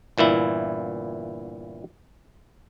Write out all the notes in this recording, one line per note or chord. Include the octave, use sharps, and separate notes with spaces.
G1 A#2 E3 E4